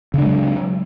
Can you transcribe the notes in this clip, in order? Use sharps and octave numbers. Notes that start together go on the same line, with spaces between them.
C#3 F#3 G#3 D4